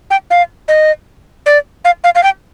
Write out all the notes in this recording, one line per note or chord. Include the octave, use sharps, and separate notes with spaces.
G5
F5
D#5
D5
F5
F5
F5
G5